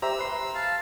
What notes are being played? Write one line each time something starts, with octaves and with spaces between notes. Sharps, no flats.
G4 C5 E5 A#5 E6
B4 C6
F5 A5